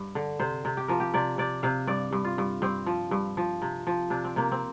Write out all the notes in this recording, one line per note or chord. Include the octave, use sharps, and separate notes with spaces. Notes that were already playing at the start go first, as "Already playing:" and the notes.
Already playing: G2
D3
C3 C5
C3
G4
F3 A#4
G4
C3 D5
C3 D5
C3 F5
G2 D5
G2
F4
G2
G2 C4
F3
G2
F3
C3
F3
C3 D4
C4
C3 A#3
C4